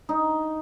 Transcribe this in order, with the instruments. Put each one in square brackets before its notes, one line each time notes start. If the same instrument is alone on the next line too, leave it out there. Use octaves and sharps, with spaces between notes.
[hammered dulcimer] D#4